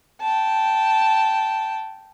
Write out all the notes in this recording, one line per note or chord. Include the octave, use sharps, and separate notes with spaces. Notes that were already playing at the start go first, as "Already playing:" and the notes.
G5 A5